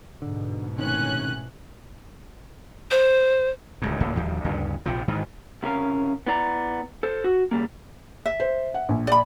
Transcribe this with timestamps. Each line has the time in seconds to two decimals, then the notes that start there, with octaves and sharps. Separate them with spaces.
0.22 G#2 B2 D3
0.78 A2 C3 D#3 C#4 F#6
2.91 C5
3.82 D1 C#2 G#2
4.00 D#1 C#2 A2 A#3
4.15 D1 D#2 F3 G3
4.44 D2 G2 C#3
4.86 A#1 C3 F3
5.08 G#2 D#3 E3
5.63 C2 C#3 C#4 A#4 F5
6.27 B3 E4 D5 A#5
7.03 A4 C5
7.24 F#4
7.51 C#3 G3 A#3
8.26 E5
8.40 C5
8.74 F#5
8.89 A#1
9.07 D5 B5